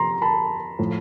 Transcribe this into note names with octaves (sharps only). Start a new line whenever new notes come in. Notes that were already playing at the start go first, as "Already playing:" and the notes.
Already playing: C3 F3 A#5 C6
A5 B5
A2 F3